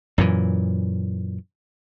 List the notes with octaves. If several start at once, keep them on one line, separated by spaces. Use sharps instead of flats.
F#2 A#2 E3